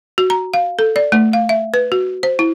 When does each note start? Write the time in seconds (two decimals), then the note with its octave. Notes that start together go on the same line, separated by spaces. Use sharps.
0.18 F#4
0.30 A#5
0.54 F5
0.79 A4
0.96 D5
1.12 A3
1.33 F5
1.49 E5
1.74 B4
1.92 F#4
2.23 C5
2.39 E4